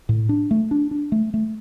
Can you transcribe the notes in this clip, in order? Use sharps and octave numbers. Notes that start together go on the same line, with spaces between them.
A2
D4
A3
D4
D4
A3
A3